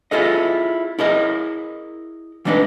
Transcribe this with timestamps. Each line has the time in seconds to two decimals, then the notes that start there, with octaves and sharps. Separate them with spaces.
0.11 E4 F4 G#4 A4 D#5
0.99 E4 G#4 A#4 D#5
2.45 E3 G#3 D4 D#4 B4